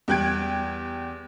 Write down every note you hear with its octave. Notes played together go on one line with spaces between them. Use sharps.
E2 G3 G5 F#6 G#6 D7